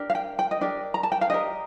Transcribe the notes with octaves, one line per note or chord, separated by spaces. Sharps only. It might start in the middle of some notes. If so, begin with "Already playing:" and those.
Already playing: D4 G4 A#4
F5
G5
G5
D#5
D4 G4 A#4 D5
A#5
A5
G5
F5
D4 G4 A#4 D#5